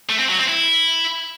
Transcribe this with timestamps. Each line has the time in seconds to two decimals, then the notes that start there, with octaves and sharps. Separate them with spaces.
0.09 A3
0.19 C4
0.29 F#3
0.38 C4
0.48 E4